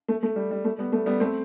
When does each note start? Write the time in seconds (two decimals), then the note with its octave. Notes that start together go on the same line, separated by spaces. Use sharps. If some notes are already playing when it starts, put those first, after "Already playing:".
0.08 A3
0.23 A3
0.36 G3
0.51 G3
0.64 A3
0.78 G3 B3
0.92 A3
1.06 G3 B3
1.20 A3 C4